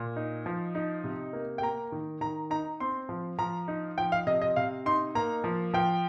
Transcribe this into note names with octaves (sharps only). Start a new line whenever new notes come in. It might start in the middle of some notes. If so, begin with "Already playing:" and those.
Already playing: A#2
D#4
F3
D#4
C3
A#3
G5
A#3 A#5
D#3
D#3 A#5
D#4 A#5
C4 C6
F3
F3 A#5
D#4
F3 G5
F5
C3 D#5
D#5
C3 F5
D#4 C6
A#3 A#5
F3
F3 G5